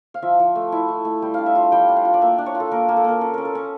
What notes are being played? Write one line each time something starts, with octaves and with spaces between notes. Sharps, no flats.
F5
F3 E5
F3
A3
E4
A3
A3
G3 G5
D4 F5
E5
F4 F5
G3 G5
D4
F5
F4
D5
A#3 E5
D4
C#5
F4
A4
A#3 A#4
A#3
A4
A#3 A#4
C#4 A4
C#4 A#4
A4
C#4